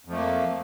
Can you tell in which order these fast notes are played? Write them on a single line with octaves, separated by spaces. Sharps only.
F2 F3 A3 A#3